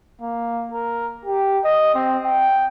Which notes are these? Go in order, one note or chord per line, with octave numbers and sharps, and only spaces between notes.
A#3
A#4
G4
D#5
C4
G5